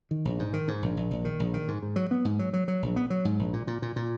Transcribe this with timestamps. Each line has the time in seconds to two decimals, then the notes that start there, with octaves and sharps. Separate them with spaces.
0.11 D#3
0.25 A#1
0.39 G#2
0.53 D#3
0.68 G#2
0.82 A#1
0.97 A#1
1.11 A#1
1.25 D#3
1.40 A#1
1.54 D#3
1.68 G#2
1.83 G#2
1.96 F#3
2.11 B3
2.25 G#2
2.39 F#3
2.53 F#3
2.68 F#3
2.82 A#1
2.96 B3
3.10 F#3
3.25 G#2
3.39 A#1
3.53 A#2
3.67 A#2
3.82 A#2
3.96 A#2